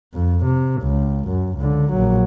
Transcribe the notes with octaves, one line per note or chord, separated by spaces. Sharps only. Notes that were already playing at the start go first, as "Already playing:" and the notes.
F2
C3
C#2
F#2
C#2 D3
A#1 F#3